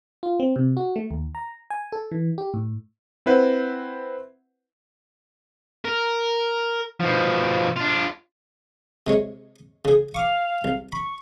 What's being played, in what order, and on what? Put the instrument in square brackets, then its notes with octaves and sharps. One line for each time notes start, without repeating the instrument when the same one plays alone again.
[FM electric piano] F4
C4
C3
F#4
A3
D#2
A#5
G#5
A4
E3
G4
A2
[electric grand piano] C4 E4 B4 C5 F#5
[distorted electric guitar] A#4
B2 F3
D4 F4
[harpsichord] C3 G#3 C#5
C#3 G#4
[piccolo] F5 [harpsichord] C#6 D6
[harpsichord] C2
[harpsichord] B5 [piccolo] C#6